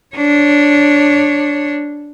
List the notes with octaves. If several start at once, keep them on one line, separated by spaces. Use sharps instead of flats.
D4 C#5